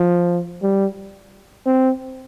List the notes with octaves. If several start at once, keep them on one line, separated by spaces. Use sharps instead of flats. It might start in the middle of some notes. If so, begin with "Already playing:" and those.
Already playing: F3
G3
C4